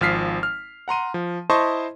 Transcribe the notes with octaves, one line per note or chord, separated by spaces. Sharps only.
G#1 F3 F6 B6 C7
F6
F#5 A#5 C6 D#7
F3
E4 C5 D#5 A5 C6 C#6